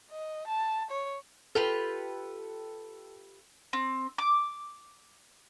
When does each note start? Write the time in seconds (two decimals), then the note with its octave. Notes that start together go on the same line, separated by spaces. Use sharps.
0.10 D#5
0.47 A5
0.91 C#5
1.55 F4 G4 A4 B4
3.73 C4
4.18 D6